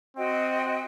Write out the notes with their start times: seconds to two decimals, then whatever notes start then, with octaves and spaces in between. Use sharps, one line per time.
0.17 C4 F#4 D#5 G5